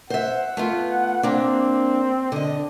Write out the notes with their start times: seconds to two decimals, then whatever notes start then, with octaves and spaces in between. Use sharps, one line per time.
0.10 C5 E5 F#5
0.57 A3 B3 F4
1.23 A#3 C4 D4
2.32 D3 D4 D#5